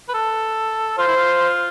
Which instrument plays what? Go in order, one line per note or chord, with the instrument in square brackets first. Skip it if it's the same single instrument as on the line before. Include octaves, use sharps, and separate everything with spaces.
[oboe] B4
A4
[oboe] F4 [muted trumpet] C5
[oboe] E4
F4